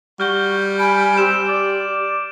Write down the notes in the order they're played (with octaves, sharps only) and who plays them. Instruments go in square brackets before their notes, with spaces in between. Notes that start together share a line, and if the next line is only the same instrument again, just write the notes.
[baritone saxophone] G3 [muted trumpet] F#4 [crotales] F6 G6 G7
[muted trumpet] G#5 [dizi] B5 [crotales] D7
[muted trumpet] C4 [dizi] G4 [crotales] E7
[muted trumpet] D5